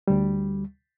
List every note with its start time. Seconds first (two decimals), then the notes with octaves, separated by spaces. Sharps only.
0.08 D2 G3